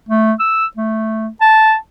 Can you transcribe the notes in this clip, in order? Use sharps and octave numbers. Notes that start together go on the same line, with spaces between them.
A3
E6
A3
A5